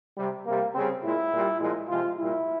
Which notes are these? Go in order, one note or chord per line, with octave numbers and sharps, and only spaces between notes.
C3 G3
C3 G3 A#3
C#3 G3 C4
A#2 G#3 E4
A#2 G3
A#2 F3 G#3
C3 F3 G#3 F4
A#2 G3 E4